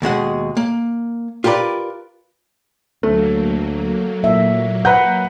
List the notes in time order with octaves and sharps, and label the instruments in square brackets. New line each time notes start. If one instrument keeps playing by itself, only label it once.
[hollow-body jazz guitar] D#2 B2 G#3 F#5
A#3
F4 G4 A#4 B4 D5
[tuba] D2 [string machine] F#3 A#3 [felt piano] A3
[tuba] A#2 [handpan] E5
[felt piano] B4 A#5 G6 [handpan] F#5